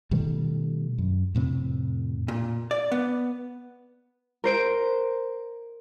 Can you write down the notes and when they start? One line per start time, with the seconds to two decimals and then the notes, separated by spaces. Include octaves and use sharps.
0.11 B2 D#3 G3 A3
0.98 F#2
1.35 F2 A2 C3
2.28 A#2
2.71 D5
2.92 B3
4.44 A#4 C5 D7